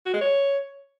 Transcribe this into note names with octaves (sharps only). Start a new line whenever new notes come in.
F#4
G#3
C#5